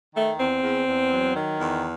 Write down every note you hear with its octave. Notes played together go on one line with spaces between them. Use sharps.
D#3 A3
E2 C4
E2
E2
F#3
D#3
E2